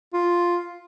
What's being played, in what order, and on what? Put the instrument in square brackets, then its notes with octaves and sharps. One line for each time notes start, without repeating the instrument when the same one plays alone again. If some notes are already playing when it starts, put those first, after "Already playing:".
[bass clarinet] F4